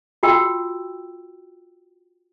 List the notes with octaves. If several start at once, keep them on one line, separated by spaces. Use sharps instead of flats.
F4 F#4 G5 E6